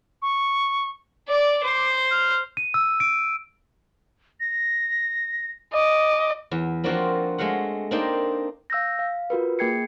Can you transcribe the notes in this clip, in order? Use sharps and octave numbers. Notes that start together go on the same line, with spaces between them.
C#6
D5 D6
C5
F6
D#7
E6
D7
A#6
D#5 D6
E2
F3 A#3 C4 D4 F4 F#4
G#3 A3 F#4 F5 F#5
A#3 C4 D4 D#4 D5 G5
F5 E6 G6 A#6
F5
F4 F#4 A#4 B4
A#3 G#4 G5 G#6 C7 C#7